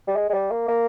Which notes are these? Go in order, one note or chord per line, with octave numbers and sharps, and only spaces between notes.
G3
G#3
G#3
G3
A#3
A#3